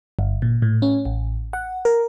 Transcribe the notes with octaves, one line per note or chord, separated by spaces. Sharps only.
G1
A#2
A2
C#4
A1
F#5
A#4